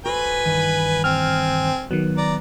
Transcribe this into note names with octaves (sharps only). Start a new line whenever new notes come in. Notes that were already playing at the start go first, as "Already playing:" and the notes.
F#4 A4 B4 C5 G#5 B5
G2 D#3 E3
C4 G#5 F6
D#3 F#3 B3
D5 A#5